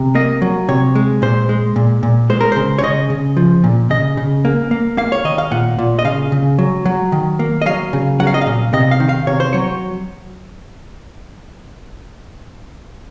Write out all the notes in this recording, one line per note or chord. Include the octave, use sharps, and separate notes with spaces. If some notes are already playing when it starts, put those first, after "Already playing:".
Already playing: C3
A#3 D#5
F#3
C3 C#5
G#3
A#2 C5
G#3
A#2
A#2
G#3 C5
A#4
C#3 C5
C#5
C#3 D#5
C#3
F3
A#2
C#3 D#5
C#3
A#3
A#3
A#3 F5
C#5
D#3 D#5
F5
A#2 F#5
A#2
D#5
C#3 F5
C#3
F#3
F#3
D#3
A#3
D#5
F#3 F5
C#3
F#3 F#5
F5
D#5
F5
A#2
C3 D#5
F5
D#3
F5
C3 C#5
C5
F#3 C#5